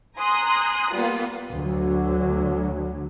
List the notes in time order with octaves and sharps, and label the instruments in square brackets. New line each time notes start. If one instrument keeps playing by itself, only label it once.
[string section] G#5 A#5 C6 D#6 F#6
G3 A#3 B3 F4
[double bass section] D2 D3 F#3